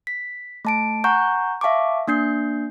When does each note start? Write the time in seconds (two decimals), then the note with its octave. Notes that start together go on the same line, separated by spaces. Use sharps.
0.07 B6
0.65 A3 A5 D7
1.04 F#5 G#5 A#5 C#6 F#6 G6
1.61 E5 F5 A5 C#6 D6
2.08 A#3 D4 G6 C7